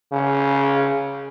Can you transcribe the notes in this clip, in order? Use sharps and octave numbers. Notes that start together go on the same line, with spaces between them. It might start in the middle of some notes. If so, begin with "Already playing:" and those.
C#3